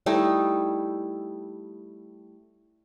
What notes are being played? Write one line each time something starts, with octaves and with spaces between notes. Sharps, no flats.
G3 A3 D#4 E4